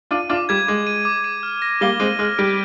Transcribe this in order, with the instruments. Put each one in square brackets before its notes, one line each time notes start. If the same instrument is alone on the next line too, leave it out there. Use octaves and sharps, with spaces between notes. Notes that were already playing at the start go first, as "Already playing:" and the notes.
[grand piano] D4 F4 [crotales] D#7
[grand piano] D4 F4 [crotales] D6
[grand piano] G3 [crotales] G#6
[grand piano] G#3 [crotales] D6
[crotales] D#7
D6
D#7
F6
A#6
[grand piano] G3 A#3 [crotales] G7
[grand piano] G#3 C4 [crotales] D#7
[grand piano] G#3 [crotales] F6
[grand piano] G3 [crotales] D7